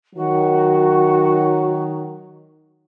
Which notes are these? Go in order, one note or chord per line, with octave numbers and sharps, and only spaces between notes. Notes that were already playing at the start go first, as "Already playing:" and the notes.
D#3 F#3 F#4